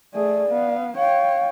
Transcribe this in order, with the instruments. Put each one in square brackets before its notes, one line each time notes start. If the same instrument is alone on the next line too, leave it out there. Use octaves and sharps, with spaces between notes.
[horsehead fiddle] A3 G#4 [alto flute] D5
[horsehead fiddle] B3 F5
[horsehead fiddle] C#5 G5 [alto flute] F5